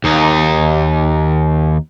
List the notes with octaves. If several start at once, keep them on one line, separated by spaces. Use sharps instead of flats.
D#2 D#4